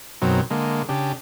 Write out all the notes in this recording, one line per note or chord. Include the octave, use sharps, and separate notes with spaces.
F#2 B2 D#3 F#3 C4
D3 G#3 A#3
C#3 D4 G4